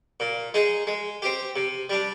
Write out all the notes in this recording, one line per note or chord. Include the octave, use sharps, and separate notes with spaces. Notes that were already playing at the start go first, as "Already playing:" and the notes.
A#2
G#3 D#4 G#4
G#3
C4 G4
C3
G3 D4